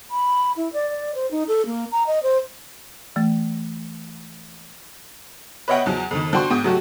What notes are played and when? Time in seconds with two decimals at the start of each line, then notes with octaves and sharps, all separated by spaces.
0.11 B5
0.56 E4
0.73 D5
1.15 C5
1.31 D#4
1.48 A4
1.66 A#3
1.92 A#5
2.07 D#5
2.23 C5
3.16 E3 A3
5.68 B4 C#5 D#5 E5 F#5 G5
5.86 E2 F3 F#3
6.11 F2 D#3
6.33 F3 D4 F#4 G5 C6 C#6
6.50 G#2 G5 D#6
6.64 F#3 A3 F#4 G4